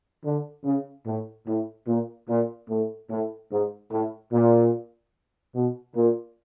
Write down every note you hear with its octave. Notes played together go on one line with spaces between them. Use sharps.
D3
C#3
A2
A2
A#2
A#2
A2
A2
G#2
A2
A#2
B2
A#2